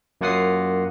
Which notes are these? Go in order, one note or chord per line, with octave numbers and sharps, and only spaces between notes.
F#2 A#3 F4 F#5 D#6 C7